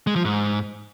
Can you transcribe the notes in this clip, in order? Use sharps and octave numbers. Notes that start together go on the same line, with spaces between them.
G#3
F3
G#2